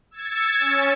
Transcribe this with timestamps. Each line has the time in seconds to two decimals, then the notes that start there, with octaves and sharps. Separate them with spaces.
0.11 E6 G#6 A6 C#7
0.60 C#4